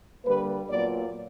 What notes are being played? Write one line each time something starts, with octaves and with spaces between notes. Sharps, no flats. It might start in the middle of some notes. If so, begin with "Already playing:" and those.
D3 G3 A#3 B4
A#2 F#3 B3 D5